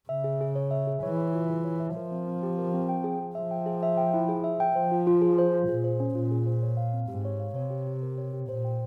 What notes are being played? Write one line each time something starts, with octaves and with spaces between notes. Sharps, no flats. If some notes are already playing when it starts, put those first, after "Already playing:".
C#3 E5
G#4
G#4
C#5
E5
G#4
E3 C#5
E5
F4
G#4
C#5
E5
F3 A#4
C4
C4
G4
A#4
C4
G5
G#4
G#4
F3 E5
G5
G#4
E5
G5
E4
G#4
E5
G5
F3 C5
F4
F4
G#4
C5
F4
A#2 G#4
C5
C#4
A#2 F4
G#4
C5
C#5
F5
C4
G#2 G4
C#5
F5
C3 C#5
G4
G4
A#4
C#5
G4
A#2 C5
G5